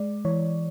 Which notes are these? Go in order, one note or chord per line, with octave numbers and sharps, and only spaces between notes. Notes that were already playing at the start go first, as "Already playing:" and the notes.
Already playing: G#3 D5
E3 C#5